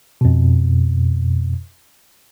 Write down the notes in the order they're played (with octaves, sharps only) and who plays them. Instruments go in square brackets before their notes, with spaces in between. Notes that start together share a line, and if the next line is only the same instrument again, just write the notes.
[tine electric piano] F2 B2